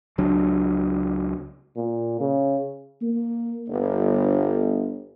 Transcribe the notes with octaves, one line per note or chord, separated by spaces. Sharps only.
C#2 F#3 D4
A#2
C#3
A#3
G1